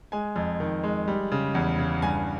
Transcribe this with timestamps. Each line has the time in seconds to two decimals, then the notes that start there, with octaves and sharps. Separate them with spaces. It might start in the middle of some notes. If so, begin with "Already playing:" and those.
0.12 G#3 G#5
0.36 F2
0.60 D#3
0.84 G#3
1.08 G3
1.32 C#3
1.55 E2
1.79 C#3
2.02 G2 G#5